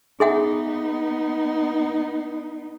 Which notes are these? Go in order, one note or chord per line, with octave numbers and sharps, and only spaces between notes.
B3 D#4 G#4 E5 F#5